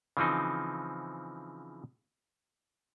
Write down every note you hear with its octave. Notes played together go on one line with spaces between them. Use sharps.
C#3 E3 F3 C4 D#4